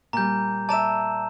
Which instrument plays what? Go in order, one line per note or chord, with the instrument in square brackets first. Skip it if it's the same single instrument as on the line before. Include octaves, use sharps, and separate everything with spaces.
[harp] A#2 G3 [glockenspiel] A#5 G6
[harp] D5 E5 [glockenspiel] A5 A#5 E7